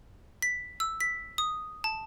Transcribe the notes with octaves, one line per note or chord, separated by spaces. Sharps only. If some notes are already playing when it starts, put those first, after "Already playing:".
B6
E6
B6
D#6
A5